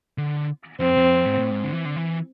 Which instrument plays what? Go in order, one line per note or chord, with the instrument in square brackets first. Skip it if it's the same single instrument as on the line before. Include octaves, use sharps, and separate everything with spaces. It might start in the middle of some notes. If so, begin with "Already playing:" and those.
[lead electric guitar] D3
[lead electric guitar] F2 [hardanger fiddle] C4
[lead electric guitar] F2
G#2
A2
G#2
D3
E3
D3
E3